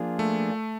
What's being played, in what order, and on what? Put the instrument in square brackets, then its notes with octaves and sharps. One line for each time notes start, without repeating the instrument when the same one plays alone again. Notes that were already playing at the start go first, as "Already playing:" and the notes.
Already playing: [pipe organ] F3 A#3 D4 F4 G#4
[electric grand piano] A3